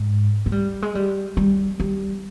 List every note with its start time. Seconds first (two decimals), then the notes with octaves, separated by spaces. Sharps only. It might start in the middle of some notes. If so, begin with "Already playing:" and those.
Already playing: G#2
0.46 G#3
0.52 G3
0.82 G#3
0.95 G3
1.37 G3
1.80 G3